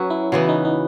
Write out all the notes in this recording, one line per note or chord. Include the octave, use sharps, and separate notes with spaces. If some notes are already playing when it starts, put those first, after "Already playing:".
Already playing: F#3 C#4 F#4 B4
E4
C#3 E3 B3 F#4
D#4
D#4